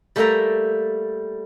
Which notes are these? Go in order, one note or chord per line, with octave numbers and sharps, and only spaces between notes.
G3 A3 A#3 E5 G5 A#5